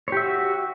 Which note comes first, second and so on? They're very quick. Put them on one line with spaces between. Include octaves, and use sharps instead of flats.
C#5 G4 E5 F#4